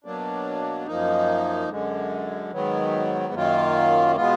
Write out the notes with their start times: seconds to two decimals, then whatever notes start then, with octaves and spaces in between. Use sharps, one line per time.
0.04 B2 F#3 A#3 D4
0.87 F#2 F3 A#3 D#4
1.69 F#2 D3 G#3
2.52 G#2 D#3 F#3 B3
3.33 F#2 D#3 F#3 A#3 F4
4.16 B2 G#3 B3 F4